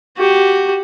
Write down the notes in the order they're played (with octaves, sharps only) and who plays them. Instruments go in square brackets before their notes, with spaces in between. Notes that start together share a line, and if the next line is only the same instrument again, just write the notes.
[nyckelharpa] F#4 G4